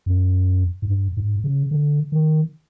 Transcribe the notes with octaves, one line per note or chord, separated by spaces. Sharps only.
F#2
G#2
G2
G#2
C#3
D3
D#3